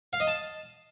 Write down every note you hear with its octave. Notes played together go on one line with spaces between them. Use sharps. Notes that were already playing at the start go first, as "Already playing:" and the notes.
F5
D#5
A5